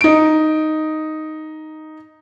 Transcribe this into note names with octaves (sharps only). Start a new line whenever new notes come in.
D#4 D7